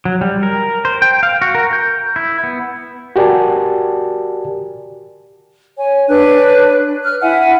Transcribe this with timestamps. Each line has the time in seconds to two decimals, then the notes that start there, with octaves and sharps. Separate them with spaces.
0.05 F#3
0.21 G3
0.43 A#4
0.85 C5
1.02 G5
1.23 F5
1.42 F#4
1.55 A#4
1.73 G6
2.16 E4
2.44 B3
3.16 F#4 G4 A#4 D5 G#5 A5
5.78 C#5 G#5
6.09 D4 B4 C#5 F#6
7.04 F6 F#6
7.21 E4 E5 F#5 G#5